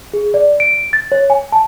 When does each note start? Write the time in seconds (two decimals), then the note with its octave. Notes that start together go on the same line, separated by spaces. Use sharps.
0.14 G#4
0.34 D5
0.60 D7
0.93 A6
1.12 C#5
1.30 G#5
1.52 A5